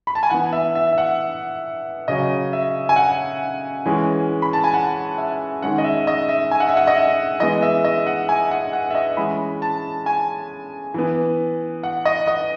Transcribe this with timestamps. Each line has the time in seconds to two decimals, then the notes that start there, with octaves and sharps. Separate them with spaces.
0.07 B5
0.15 A5
0.23 G#5
0.30 E3 B3 F#5
0.52 E5
0.75 E5
0.92 E5
0.98 F#5
2.08 C#3 F#3 C#4 D#5
2.53 E5
2.89 G#5
2.96 F#5
3.86 E3 G#3 C#4
4.42 B5
4.53 A5
4.64 G#5
4.74 F#5
5.18 E5
5.62 D#3 G#3 C#4 F#5
5.78 D#5
5.84 E5
6.07 D#5
6.29 E5
6.51 G#5
6.60 F#5
6.68 E5
6.77 F#5
6.87 D#5
6.96 E5
7.40 E3 G#3 B3 D#5
7.62 E5
7.84 D#5
8.07 F#5
8.29 G#5
8.51 F#5
8.73 F#5
8.90 E5
8.95 D#5
9.17 E3 G#3 C#4 B5
9.62 A5
10.06 G#5
10.94 E3 B3
11.83 F#5
12.05 D#5
12.27 D#5